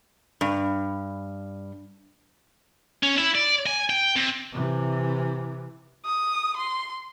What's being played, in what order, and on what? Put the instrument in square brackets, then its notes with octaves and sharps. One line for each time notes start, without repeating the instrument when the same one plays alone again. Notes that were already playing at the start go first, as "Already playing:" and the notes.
[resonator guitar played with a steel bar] G2
[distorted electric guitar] C#4
E4
D5
G#5
G5
C3
[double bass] C3 E3
[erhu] D#6
C6